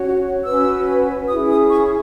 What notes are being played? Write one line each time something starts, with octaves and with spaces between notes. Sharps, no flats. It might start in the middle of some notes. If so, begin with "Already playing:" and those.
Already playing: C#4 F#4 C#5
C#4 F#4 B4 E6
C#4 E4 G#4 D#6
D#6
C#6